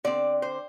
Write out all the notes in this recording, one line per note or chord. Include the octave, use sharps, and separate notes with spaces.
D3 C4 D5
C5